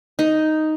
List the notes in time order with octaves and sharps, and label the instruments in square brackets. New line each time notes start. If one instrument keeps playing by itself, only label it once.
[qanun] D#4